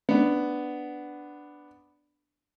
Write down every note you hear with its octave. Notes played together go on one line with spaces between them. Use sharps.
B3 D4